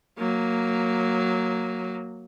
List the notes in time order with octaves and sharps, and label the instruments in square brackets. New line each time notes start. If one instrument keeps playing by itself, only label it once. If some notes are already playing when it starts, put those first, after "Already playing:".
[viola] F#3 A#3